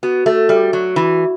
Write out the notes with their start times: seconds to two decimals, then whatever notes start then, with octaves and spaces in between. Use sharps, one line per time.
0.03 B3 F#4
0.26 A3
0.49 G3
0.73 F#3
0.96 E3